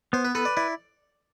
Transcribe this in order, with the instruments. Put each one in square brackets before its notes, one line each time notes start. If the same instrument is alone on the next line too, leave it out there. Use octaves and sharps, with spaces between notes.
[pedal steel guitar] B3 [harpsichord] C5
[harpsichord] B4
[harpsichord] A4 [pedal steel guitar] B4
[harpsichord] D5
[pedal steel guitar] E4 [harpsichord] D5